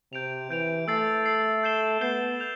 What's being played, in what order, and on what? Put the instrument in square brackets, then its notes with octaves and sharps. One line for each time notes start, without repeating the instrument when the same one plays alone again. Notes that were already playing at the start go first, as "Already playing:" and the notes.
[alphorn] C3 [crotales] G6 D7 F7
[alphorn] E3 [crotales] G6 D7 F7
[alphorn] A3 [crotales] E6 A6 C7
[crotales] E6 A6 C7
G6 C7 E7 G7
[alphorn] B3 [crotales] G6 C7 E7 G7
[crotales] G6 F7